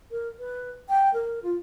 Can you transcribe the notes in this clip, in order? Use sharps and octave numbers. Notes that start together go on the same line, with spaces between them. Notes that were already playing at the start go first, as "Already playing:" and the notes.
A#4
B4
G5
A#4
F4